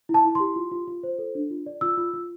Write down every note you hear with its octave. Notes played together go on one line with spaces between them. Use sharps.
E4
A5
E4
G4 C6
F4
F4
F4
C5
A4
D4
F4
D5
F4 E6
F4
F4